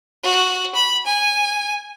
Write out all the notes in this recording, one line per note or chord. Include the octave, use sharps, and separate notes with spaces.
F#4
B5
G#5